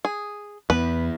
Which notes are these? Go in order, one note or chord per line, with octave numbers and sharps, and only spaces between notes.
G#4
E2 B3 B4